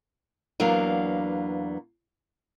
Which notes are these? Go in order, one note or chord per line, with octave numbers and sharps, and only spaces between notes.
E2 F#3 A#3 B3 D4 F5